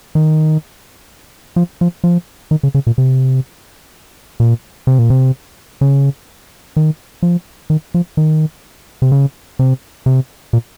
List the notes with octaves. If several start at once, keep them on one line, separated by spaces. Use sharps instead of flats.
D#3
F3
F3
F3
D#3
C#3
C#3
A#2
C3
A#2
C3
A#2
C3
C#3
D#3
F3
D#3
F3
D#3
C3
C#3
C3
C3
A#2